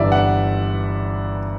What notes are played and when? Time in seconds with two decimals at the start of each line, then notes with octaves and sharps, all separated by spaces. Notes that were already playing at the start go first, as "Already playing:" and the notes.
Already playing: G1 G2 E3 D5 E5
0.12 F#5